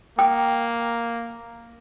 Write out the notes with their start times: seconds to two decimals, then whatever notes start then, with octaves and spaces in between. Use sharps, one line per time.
0.19 A#3 G5 D#6